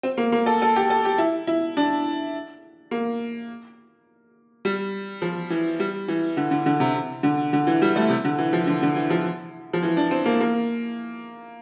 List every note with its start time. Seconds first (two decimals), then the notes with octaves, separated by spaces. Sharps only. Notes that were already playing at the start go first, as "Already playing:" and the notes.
0.03 C4
0.18 A#3
0.32 A#3
0.46 A4
0.62 A4
0.76 G4
0.90 A4
1.05 G4
1.18 E4
1.47 E4
1.77 D4
2.91 A#3
4.65 G3
5.22 F3
5.50 E3
5.80 G3
6.08 E3
6.37 D3
6.51 D3
6.66 D3
6.80 C3
7.23 D3
7.53 D3
7.67 E3
7.82 G3
7.96 A3
8.10 C3
8.25 D3
8.39 E3
8.53 F3
8.67 D3
8.82 D3
8.96 E3
9.10 F3
9.73 F3
9.83 E3
9.97 D4
10.11 C4
10.26 A#3
10.41 A#3